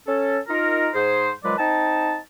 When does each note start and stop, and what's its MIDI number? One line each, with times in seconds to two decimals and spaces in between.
0.07 0.39 61
0.07 0.39 69
0.48 0.88 63
0.48 0.88 65
0.48 0.88 70
0.94 1.30 44
0.94 1.30 68
0.94 1.30 72
1.43 1.54 51
1.43 1.54 53
1.43 1.54 54
1.43 1.54 56
1.43 1.54 71
1.43 1.54 74
1.58 2.16 60
1.58 2.16 63
1.58 2.16 79
1.58 2.16 81